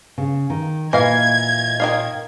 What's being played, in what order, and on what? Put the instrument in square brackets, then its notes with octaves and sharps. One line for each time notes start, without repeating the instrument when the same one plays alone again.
[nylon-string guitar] C#3
D#3
[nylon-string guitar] A#2 [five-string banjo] E3 F5 [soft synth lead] D#5 [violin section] G#6
[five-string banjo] D#3 D#5 F5